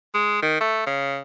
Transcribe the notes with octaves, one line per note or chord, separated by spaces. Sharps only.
G#3
D#3
A3
C#3